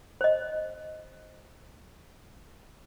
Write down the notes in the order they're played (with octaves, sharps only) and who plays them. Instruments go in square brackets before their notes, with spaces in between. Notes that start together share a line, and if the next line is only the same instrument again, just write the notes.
[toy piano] C5 D#5